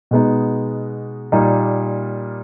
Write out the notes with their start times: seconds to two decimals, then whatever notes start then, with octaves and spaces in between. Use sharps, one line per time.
0.11 B2 G#3 B3 D#4
1.32 A#2 G3 A#3 D#4